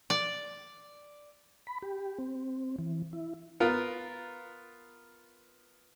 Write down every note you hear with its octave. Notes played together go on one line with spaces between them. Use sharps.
D5
B5
G4
C4
E3
E4
B3 F4 A#4